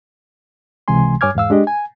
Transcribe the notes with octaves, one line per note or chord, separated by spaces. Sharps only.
C#2 C3 E3 G#3 G#5 C6
G2 C#5 G#5 D6 F6 G#6
E2 G#2 F5 E6
G#3 D4 G4 D#5
G#5